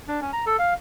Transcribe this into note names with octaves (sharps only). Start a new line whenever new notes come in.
D4
C#4
A#5
A4
F5